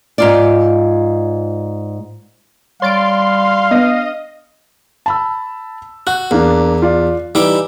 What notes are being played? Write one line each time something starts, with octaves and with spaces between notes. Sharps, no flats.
G#2 F4 D5
G3 C#5 F5 C6 A6 D7
B3 D4 D#5
A5 B5 E6
F#4 F#6
E2 A#3 D4
F4 D5
E3 G3 D#4 E4 D6